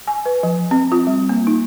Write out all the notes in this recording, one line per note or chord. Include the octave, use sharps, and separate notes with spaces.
G#5
B4
F3
C4
F4
G3
A#3
D#4